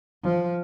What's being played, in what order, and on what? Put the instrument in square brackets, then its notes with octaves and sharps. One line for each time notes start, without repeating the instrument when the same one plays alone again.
[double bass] F3